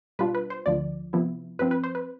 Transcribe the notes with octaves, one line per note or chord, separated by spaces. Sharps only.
B2 G3 D4 F4 B4
B4
C5
D2 D3 F3 D5
C3 F3 B3 E4
G2 F3 C4 B4
B4
C5
B4